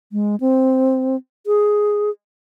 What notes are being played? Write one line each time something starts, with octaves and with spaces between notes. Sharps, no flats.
G#3
C4
G#4